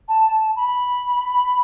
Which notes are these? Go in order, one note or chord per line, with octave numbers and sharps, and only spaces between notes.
A5
B5